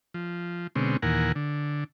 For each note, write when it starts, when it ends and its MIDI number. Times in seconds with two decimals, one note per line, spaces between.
0.14 0.67 53
0.76 0.97 47
0.76 0.97 50
0.76 0.97 56
0.76 0.97 60
0.76 0.97 61
1.02 1.32 39
1.02 1.32 46
1.02 1.32 52
1.02 1.32 70
1.02 1.32 78
1.02 1.32 80
1.36 1.84 50